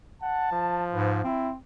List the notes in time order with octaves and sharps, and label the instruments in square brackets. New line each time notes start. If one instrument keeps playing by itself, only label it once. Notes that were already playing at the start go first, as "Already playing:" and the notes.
[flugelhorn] F#5 [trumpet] A5
[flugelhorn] F3
[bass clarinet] G#2 [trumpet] B4
[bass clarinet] C4 [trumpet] E4